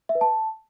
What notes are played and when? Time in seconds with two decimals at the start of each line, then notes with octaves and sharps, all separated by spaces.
0.09 E5
0.15 B4
0.21 A5